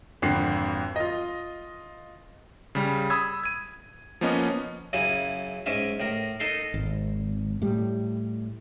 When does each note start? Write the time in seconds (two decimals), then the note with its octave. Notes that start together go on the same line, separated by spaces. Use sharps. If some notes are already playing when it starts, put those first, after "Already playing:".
0.22 G#1 F2 D3 F#4 F#5 C7
0.96 F4 D#5
2.75 C#3 G3
3.10 B5 D#6 E6 G#6
3.44 G#6 D#7
4.21 F3 A#3 B3 C#4 D#5
4.93 F#2 C#3 E4 G#5
5.66 G#2 C#4 E5
6.00 A2 A#4
6.40 D#4 A4 A#4 C6
6.74 G#1
7.62 A2 G3